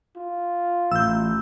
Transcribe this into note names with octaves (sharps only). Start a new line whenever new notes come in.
F4
A1 E6 G6